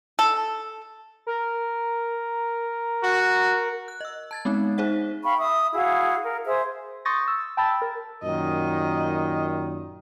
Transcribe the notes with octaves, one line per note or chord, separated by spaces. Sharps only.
A4
A#4
F#4
F#6
D#5 E6
A5 G#6 A6
G#3 B3 C4 D#4
D#4 G#4 C5 E5 F#5
F5 G5 B5 C#6
E5 D#6
E4 F#4 G#4 F5
A#4
G#4 C5 E5 D#6
C6 C#6 D#6 G6 A6 A#6
E6
G5 A5 B5 E6 A6
A#4
F#2 A#2 D#3 D#5